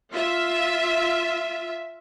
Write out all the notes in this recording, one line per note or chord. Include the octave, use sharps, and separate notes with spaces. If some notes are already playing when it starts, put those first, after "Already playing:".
F4 E5